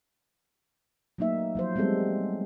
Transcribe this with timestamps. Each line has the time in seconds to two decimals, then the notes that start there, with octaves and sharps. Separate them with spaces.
1.18 F#3 A3 A#3 D#4 E5
1.55 F3 F#3 C5
1.76 G3 G#3 B3 C4 A4